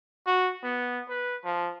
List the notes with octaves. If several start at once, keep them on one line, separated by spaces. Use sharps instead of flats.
F#4
B3
B4
F3